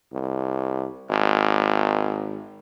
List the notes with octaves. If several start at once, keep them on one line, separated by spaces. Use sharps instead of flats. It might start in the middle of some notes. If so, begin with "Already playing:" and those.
C2
G#1